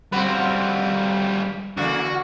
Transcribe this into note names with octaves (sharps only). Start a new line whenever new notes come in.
G3 C4 F4 F#4 B4
C#3 E3 A#3 F#4